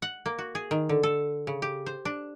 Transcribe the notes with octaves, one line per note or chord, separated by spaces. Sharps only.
F#5
A#3
F#4
G#4
D#3
D3
A4
C#3
G4
C5
D4